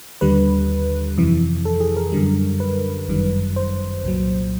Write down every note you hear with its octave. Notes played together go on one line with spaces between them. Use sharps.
D#2 D3 G3 B4
F2 C3 E3
A4
G#4
A#4
F#2 D3 G3
B4
G1 F#2 D#3 G3
C5
C2 A#2 F#3